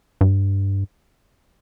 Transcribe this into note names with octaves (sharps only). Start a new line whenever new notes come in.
G2